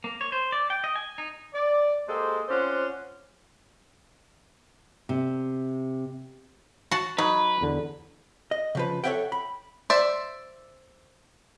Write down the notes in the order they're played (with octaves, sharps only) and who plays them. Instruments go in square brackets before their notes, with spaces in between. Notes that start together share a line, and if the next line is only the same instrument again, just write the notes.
[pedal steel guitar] A#3
C#5
C5
D5
G5
D#5
G#5
D#4
[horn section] D5
G#3 A#3 G4 A4 C5
C4 C#4 F4 C5 D5 F#5
[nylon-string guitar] C3
[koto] F#4 A5
[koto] F#3 [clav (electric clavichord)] D#4 [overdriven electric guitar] B4
[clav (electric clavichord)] E2 D3
[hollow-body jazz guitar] D#5
C#3 F3 B4
A4 C#5 D5 E5 F#5 G5
B5
[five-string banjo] C5 D5 E5